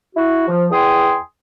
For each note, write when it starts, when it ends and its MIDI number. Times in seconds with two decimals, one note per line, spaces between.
0.15 0.46 64
0.15 0.46 66
0.48 0.66 53
0.71 1.15 40
0.71 1.15 79
0.71 1.15 80
0.71 1.15 84
0.71 1.15 87